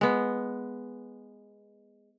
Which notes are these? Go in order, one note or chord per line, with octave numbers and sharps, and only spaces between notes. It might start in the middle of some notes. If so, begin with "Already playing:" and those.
G#3 B3